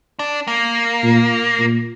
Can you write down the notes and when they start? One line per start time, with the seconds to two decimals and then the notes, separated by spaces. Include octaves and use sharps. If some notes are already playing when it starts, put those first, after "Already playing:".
0.19 D4
0.47 A#3
1.03 A#2
1.59 A#2